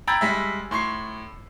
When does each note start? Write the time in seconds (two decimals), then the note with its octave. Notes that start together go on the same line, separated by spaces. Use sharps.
0.07 G5 A#5 B5 E6 G#6 A6
0.21 G3 G#3 E5
0.71 A2 C6 C#6 C7